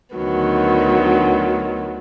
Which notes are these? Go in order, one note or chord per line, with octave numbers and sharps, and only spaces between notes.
D2 D3 D#3 F#3 B3